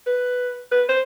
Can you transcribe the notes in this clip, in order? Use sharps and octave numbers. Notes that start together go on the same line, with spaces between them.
B4
B4
C5